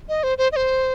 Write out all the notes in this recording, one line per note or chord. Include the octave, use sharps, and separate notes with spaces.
D#5
C5
C5
D#5
C5